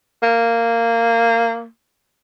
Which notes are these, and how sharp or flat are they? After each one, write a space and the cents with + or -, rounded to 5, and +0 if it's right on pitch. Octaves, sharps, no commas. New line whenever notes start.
A#3 -15